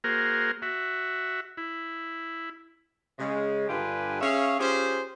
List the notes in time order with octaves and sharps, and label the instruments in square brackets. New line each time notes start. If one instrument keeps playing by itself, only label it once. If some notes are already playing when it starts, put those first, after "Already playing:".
[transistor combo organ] A#3 F#4 G#4 A#4 C5
F#4 E5
E4
[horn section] C#3 G#3
G2 D3 F4 G4 B4 G#5
C#4 G#4 C#5 E5 F5
C#4 F4 G4 G#4 C5